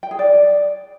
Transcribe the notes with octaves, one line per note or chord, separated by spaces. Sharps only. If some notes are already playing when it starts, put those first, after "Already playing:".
G5
G#4
D5